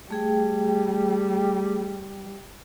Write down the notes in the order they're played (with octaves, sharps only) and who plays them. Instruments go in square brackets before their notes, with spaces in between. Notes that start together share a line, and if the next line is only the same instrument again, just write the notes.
[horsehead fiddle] G3 [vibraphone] A3 G#4 G5